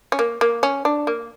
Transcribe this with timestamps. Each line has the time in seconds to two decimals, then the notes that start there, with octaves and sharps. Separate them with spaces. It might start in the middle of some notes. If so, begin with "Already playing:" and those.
0.12 C#4
0.19 A#3
0.41 A#3
0.63 C#4
0.85 D4
1.07 A#3